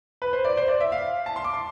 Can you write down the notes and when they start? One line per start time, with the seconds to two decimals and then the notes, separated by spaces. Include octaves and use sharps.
0.22 B4
0.33 C5
0.45 D5
0.57 C5
0.68 D5
0.81 E5
0.92 F5
1.26 A5
1.36 C6
1.44 D6
1.54 C6